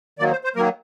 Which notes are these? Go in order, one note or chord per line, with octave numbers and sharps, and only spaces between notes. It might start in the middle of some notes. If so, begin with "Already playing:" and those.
D#3 F#3 A#3 D5
C5
C5
D#3 F#3 A#3 A#4